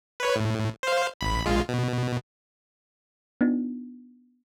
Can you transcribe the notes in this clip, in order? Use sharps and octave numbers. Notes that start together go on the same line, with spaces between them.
B4 C#5
A2
C5 F5
A1 B5
A#1 G#3 F4
B2
B3 D4 D#4 F4